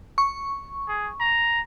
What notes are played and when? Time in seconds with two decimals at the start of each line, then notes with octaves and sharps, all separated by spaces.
0.18 C#6
0.89 G#4
1.20 A#5